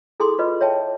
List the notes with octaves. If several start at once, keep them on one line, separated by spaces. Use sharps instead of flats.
E4 G#4 A4 G#5 C6 D#6
F4 B4 D#5
C#5 E5 G5 A5